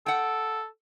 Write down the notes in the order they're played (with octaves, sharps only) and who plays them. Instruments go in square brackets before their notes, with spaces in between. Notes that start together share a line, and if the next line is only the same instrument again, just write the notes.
[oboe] A4 [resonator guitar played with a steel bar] F#5 G5